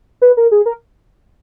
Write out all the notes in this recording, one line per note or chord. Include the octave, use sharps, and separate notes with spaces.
B4
A#4
G#4
A#4